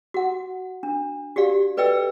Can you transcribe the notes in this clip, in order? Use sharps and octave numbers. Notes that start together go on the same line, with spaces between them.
F#4 F#5
D4
F#4 G4 D5 F5
A4 B4 D5 D#5 G5 E6